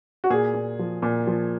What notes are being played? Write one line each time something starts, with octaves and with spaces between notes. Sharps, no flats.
F#4
A#2 G#4
A#2
F3
A#2
F3